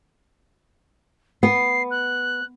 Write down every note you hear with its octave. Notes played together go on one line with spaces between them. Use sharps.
B3 C7
F#6